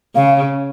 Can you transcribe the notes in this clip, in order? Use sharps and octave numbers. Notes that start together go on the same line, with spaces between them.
C#3 F5